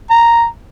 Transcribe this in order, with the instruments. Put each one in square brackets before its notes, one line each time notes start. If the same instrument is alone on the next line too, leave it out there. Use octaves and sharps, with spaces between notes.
[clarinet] A#5